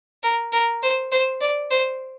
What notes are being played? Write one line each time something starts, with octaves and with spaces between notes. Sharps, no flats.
A#4
A#4
C5
C5
D5
C5